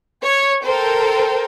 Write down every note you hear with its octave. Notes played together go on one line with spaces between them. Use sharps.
C#5
A4 A#4 C5 G5